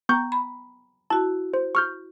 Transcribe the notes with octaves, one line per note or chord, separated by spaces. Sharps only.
B3 G5 A#5 C#6 G6
B5
E4 F#4 A5
C5
C#6 F6 G6